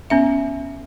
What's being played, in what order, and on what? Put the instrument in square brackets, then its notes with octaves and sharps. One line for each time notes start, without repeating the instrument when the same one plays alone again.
[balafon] B3 C#4 E5